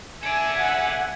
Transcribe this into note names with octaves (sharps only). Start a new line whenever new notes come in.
A4 D5 E5 G#5 G#6 D7
F#5